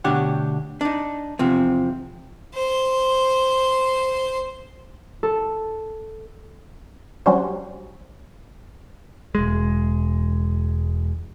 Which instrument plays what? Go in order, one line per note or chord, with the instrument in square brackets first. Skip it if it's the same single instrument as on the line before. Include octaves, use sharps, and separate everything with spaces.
[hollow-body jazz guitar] D2 B2 D4 G4 C#5 F#5
D4 D#4
E2 C3 F3 C4
[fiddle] C5 C6
[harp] A4
[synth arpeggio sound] F#3 G3 C#4 D4 F#4 C5
[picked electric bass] E1 G#3